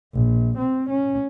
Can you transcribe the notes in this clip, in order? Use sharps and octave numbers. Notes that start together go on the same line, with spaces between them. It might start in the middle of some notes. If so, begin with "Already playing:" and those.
A#1
C4
C#4